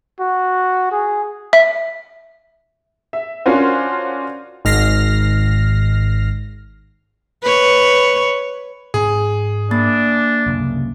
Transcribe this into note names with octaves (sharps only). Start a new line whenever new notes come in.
F#4
G#4
E5
E5
C#4 D4 F4 F#4 A#4 C5
G#1 G#2 F6 A#6 C7
B4 C#5
G#2 C4 G#4
A#3 D4 A6
C2 F#2 C#3